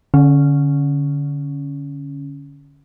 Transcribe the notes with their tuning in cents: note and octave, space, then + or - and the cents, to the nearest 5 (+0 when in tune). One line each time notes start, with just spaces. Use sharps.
D3 -15 C#4 +0